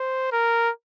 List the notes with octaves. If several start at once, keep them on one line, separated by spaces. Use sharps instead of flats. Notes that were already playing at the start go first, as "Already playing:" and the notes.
Already playing: C5
A#4